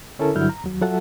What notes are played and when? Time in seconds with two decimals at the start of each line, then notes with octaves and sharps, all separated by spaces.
0.19 D3 C#4 E4 A4 A#4 A5
0.36 G2 D3 F#3 E4 F6 G6
0.49 A#5
0.64 D#2 F#3
0.81 F#3 F4 A4 E5 F#5 A5